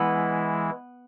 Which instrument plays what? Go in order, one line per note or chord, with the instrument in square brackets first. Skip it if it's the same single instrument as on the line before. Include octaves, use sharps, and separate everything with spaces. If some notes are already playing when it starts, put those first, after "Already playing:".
Already playing: [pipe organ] E3 G#3 E4 [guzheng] B3